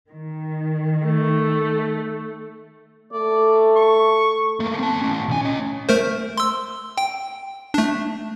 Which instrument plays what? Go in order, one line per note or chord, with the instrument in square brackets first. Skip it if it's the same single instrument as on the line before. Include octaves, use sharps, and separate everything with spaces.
[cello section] D#3
[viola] A3
[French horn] A3 [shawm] D5
[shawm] C#6
[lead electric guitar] A3 A#3
C4 A5
A3 C#4
B1 G#5
C#4 D#5
[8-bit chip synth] A3 A#4 C5
C6 E6
G5
A3 D4